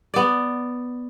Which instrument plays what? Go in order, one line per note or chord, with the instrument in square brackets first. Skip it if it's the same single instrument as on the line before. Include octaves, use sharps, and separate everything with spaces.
[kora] B3 D5